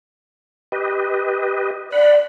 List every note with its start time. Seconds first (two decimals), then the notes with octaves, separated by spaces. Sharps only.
0.72 G4 B4 D#5
1.92 D5 F#5 B5